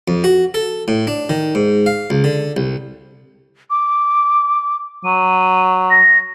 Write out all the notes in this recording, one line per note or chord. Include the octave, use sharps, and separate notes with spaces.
F2
F#4
A4
A2
D4
D#3
G#2
F5
C#2
D3
C2
D6
F#3 D#7
A#6